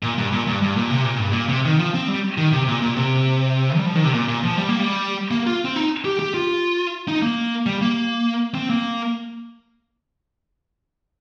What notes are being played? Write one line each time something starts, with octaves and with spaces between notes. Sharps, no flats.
A#2
G2
A#2
G2
G2
A#2
C3
A#2
G2
A#2
C3
D#3
F3
C4
G3
D#3
C3
A#2
A#2
C3
G3
F3
D#3
C3
A#2
A#2
F3
G3
A#3
G3
A#3
F4
C4
D#4
G4
G4
F4
D#4
A#3
G3
A#3
C4
A#3